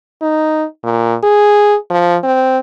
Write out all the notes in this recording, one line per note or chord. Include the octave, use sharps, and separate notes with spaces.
D#4
A#2
G#4
F3
C4